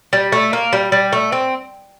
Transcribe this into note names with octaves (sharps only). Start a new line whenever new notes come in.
G3
A3
A#3
G3
G3
A3
C4